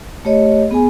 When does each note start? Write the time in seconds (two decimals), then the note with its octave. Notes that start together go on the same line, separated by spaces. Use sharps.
0.25 A3 G4 C#5 D#5
0.71 B3 G#4 G#5